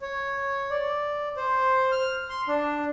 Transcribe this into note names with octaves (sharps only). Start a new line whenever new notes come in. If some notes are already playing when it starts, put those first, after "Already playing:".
C#5
D5
C5
F6
C6
D4